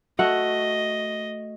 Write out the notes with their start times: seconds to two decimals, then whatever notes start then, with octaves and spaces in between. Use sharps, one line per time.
0.19 A3 F#4 D#5 F#5